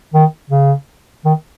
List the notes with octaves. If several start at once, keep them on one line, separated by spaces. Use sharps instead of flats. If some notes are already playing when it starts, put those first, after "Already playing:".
D#3
C#3
D#3